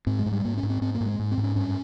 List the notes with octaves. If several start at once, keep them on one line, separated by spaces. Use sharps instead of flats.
G#2 C4
G#3
G#2
G3
G#2 A#3
C#4
G#2
C4
G#2 C4
A#3
G#2
G#3
G#2
C4
G#2
C#4
G2 C#4